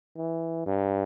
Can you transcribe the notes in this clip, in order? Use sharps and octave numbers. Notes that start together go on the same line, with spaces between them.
E3
G2